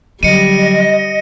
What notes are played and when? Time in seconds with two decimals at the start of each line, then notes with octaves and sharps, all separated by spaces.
0.23 D3 F#3 G3 D#5 C#7 D#7